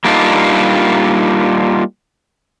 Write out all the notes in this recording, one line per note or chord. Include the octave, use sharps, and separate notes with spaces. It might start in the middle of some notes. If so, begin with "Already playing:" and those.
G3 A#3 D4 D#4 F4